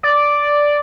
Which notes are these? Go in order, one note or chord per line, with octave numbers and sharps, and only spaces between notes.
D5